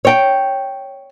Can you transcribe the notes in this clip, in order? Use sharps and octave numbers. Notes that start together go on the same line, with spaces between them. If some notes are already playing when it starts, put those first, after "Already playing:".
C#5 G5